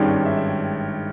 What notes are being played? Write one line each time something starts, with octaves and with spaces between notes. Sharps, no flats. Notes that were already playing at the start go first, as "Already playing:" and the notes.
Already playing: G#1 G2 D#3 G#3 C#4 G5
E5
E5